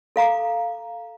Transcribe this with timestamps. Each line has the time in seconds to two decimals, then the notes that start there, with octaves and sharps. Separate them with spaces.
0.16 A4 F5 A#5 D6